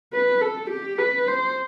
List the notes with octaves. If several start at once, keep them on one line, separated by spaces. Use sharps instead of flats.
B4
A4
G4
B4
C5